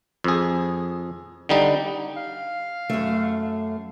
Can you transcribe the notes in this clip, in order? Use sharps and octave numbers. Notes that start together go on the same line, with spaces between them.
F2 G#4
D3 G3 D#4
F5
F#2 A3